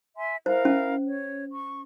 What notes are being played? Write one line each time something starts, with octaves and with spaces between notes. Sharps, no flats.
E5 G#5 C6
E4 A#4 C5 F5
C#4
C#5
C#6